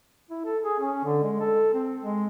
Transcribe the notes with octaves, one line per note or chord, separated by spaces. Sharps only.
E4
A4
G#4
C#4
D3
G#3
A4
C4
G#3